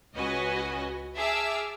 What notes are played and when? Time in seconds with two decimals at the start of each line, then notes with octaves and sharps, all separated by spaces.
0.15 C#2 C#4 F#4 B4 D#5 G#5
1.16 G#4 E5 A5 D6 E6 F6